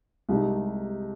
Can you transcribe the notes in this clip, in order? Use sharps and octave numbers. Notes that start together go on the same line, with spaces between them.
C2 C3 G#3 D#4